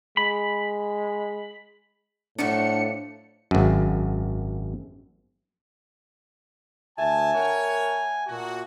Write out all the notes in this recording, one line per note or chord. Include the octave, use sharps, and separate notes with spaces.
G#3 B5
A2 F3 F#3 A3 D4 C#7
G#1 F#2
D2 A3 G#5 A5
A#4 C#5 F#5 G5
A#2 F#4